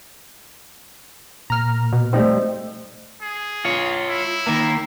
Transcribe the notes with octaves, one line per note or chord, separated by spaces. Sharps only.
A#2 A#5 F6
B2
F3 G3 A3 C4 D#4
G#4
F4 C#5
E4
D#3 A#3